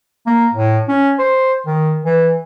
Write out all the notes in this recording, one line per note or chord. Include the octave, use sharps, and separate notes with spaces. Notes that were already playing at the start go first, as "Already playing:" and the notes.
A#3
A2
C#4
C5
D#3
E3